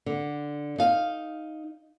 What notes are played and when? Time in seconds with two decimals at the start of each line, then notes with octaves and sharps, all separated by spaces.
0.06 D3
0.78 D#4 F5